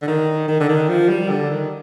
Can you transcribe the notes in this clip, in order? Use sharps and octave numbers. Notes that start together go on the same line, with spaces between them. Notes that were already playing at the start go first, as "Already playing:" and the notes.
D3
D#3
D#3
D3
D#3
F3
G3
D3
D#3